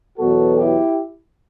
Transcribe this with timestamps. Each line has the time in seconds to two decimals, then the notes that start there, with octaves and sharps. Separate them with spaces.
0.18 E2 B2 F#3 B3 F#4 A4
0.57 E4 G4